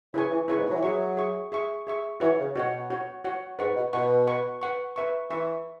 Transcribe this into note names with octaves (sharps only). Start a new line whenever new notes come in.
C#3 E4 B4 G#5 C#6
E3
C#3 E4 B4 G#5 C#6
G#2
B2
F#3
E3
F#3 G#4 E5 C#6
G#4 E5 C#6
G#4 E5 C#6
G#4 E5 C#6
E3 F#4 C#5 F#5
C#3
B2 F#4 C#5 F#5
F#4 C#5 F#5
F#4 C#5 F#5
G#2 B4 F#5 C#6
B2
B2 B4 F#5 C#6
B4 F#5 C#6
B4 F#5 C#6
B4 E5 C#6
E3 B4 E5 C#6